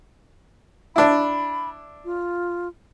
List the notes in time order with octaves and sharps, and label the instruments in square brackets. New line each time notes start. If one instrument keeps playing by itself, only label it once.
[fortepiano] D4 E4 [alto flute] B5
[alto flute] F4